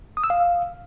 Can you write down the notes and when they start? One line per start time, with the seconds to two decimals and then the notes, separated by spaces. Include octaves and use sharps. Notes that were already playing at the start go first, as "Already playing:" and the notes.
0.17 D#6
0.24 E6
0.30 F5